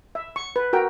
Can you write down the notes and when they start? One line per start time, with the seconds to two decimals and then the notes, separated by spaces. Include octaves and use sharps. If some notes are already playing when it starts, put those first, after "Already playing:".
0.15 E5
0.36 C#6
0.56 B4
0.73 F#4 A#4 G5